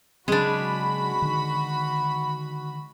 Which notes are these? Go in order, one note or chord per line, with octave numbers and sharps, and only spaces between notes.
C#3 F#3 G#3 C4 D4 F#4 B5
D3 D#3